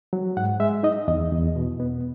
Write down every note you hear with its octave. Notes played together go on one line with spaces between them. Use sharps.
F#3
G#2 F#5
G#3 E5
D#4 D#5
E2 D#5
E2
B2
B3